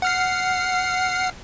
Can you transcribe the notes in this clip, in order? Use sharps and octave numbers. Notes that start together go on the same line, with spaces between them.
F#5 F6 C7